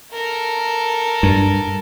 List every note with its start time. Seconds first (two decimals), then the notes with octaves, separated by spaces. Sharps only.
0.13 A4 A#4
1.23 G2